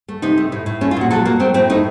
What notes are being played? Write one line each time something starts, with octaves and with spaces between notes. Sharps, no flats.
A3
C3 D#4
A3
A2
A2
A3 C#4
F4
A#2 F#4
F#3 A4
F#3 A#3
A3 C4
A2 C4
A3 D#4